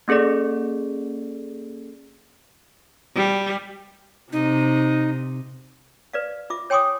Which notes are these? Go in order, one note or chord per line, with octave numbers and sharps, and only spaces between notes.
A#3 C#4 G#4 A4 D5
G3
C3 D#4
B4 D5 F5
F4 E5 D6
C#5 G5 G#5 C6 D6 D#6